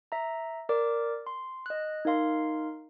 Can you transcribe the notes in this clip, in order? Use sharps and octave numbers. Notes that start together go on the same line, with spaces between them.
E5 A#5
A#4 D5 D6
C6
D#5 F#6
D#4 A#4 F5 C6